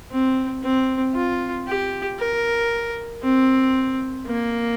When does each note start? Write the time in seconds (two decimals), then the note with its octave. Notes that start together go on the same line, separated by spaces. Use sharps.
0.11 C4
0.63 C4
1.15 F4
1.68 G4
2.19 A#4
3.23 C4
4.27 A#3